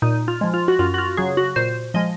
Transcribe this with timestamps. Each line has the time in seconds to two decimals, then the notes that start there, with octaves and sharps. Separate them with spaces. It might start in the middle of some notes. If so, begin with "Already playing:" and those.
0.02 A#2 D#4
0.28 F4
0.41 F3 G#3
0.54 F4
0.68 F#4
0.79 F#2 F4
0.94 F#4
0.98 F4
1.17 C#3 F#3 G#4
1.37 F#4
1.56 A#2 C5
1.94 F3 G#3 D#5